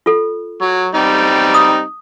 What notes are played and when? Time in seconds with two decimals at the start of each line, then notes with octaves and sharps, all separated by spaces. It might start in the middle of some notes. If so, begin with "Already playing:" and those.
0.06 F4 A4
0.61 F#3
0.95 G3 C4 D#4
1.54 D#6